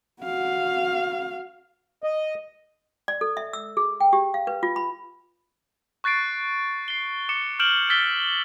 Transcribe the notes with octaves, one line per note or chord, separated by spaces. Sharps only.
F#4 F5
D#5
D5
A4
E5
E6
G#4
G5
G4
F5
B4
F4
B5
C#6 F#6 A6 C7 D7
C7 G7
D6 C#7 E7
F6 G6 D7 E7 F#7
E6 F6 A6 B6 C#7 G7